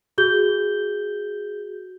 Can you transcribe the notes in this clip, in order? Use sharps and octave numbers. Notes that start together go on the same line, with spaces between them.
F#4 G#4 G6 G7